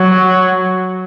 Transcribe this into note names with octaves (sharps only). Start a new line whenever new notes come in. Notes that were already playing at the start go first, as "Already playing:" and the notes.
Already playing: F#3